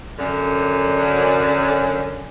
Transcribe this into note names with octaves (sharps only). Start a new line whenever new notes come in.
F#2 D3